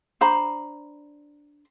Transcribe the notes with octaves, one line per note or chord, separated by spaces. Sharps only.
D4 C5 A#5 B5